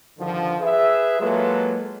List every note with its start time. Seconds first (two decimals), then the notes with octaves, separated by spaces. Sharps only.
0.19 G2 D3 D#3 F3
0.61 G#4 B4 E5
1.21 F#3 G#3 A#3 F4 A4 B4